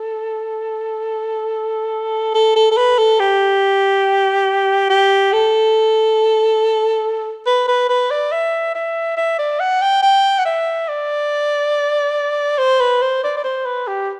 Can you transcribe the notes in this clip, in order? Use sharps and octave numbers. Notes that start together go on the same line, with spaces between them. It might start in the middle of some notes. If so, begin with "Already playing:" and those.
Already playing: A4
A4
A4
A4
B4
A4
G4
G4
A4
B4
B4
B4
D5
E5
E5
E5
D5
F#5
G5
G5
F#5
E5
D5
C5
B4
C5
D5
D5
C5
B4
G4